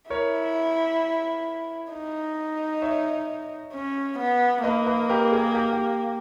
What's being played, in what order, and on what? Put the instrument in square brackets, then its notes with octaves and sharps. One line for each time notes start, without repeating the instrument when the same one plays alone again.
[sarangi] E4 [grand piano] A#4 C#5
[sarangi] D#4
[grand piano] C#5 E5
[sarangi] C#4
B3
[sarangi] A#3 [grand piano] B4 D#5
[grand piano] B4 D#5
G4 A#4
G#4
G4
G4